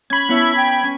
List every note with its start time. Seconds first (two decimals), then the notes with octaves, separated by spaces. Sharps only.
0.10 C#4 B5 G#6
0.29 B3 E4 C#5 A5
0.56 G5
0.83 C#4